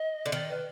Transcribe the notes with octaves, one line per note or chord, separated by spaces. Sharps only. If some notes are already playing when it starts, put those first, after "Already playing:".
Already playing: D#5
D3
D#3 D5
B4